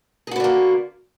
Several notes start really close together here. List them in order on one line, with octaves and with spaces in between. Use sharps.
G#4 F#4 B3 D3 A#3